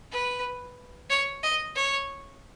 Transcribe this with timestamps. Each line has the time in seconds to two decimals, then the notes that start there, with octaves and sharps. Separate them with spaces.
0.12 B4
1.10 C#5
1.43 D#5
1.75 C#5